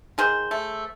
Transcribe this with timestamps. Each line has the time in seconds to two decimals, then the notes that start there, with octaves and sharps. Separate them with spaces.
0.18 D#3 G#4 C5
0.51 A3